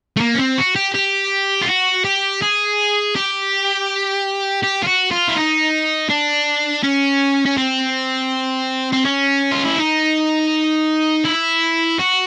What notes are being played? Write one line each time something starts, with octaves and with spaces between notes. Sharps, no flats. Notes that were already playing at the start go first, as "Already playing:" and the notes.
A3
A#3
C#4
C4
F#4
G4
G4
F4
F#4
G4
G#4
G4
G4
F4
F#4
F4
E4
D#4
D4
C#4
C#4
C4
C4
C#4
F4
E4
D#4
E4
F#4